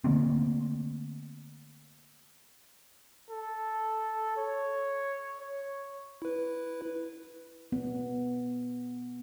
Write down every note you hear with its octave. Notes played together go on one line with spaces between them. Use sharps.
D3 A3 A#3 C4
A4
C#5
C#5
E4 B4
B3